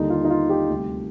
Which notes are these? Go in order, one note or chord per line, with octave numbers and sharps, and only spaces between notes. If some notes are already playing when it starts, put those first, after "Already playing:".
Already playing: D#2 D3 G3 D#4
F4
D#4
F4
G4
D2 C3 G3